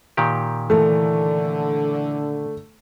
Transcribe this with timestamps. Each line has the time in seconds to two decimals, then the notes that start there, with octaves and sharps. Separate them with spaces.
0.17 A#2 D#3 G4
0.70 D3 E3 A3 A#4 C#5